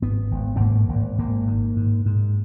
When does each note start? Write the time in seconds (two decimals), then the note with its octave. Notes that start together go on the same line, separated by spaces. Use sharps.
0.02 G#1 B3
0.31 G#1
0.56 B3
0.60 G#2 A#3
0.89 G#1
1.18 G#1 A#3
1.47 G#2
1.76 G#2
2.06 G#2